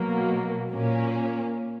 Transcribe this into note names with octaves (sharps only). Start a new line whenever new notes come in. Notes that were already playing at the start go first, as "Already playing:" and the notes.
Already playing: B2 F#3 A#3
A#2 A#3 C#4